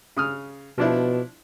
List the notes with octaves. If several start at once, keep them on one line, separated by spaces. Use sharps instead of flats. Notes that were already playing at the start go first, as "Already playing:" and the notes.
C#3 D#6 F6
B2 F3 D4 E4